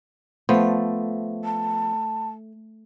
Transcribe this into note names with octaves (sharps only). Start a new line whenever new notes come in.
F3 A3 B3 C5
A5